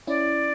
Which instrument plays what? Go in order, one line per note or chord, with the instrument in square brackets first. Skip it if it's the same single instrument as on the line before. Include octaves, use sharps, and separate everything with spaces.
[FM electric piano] C#4 E4 [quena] D5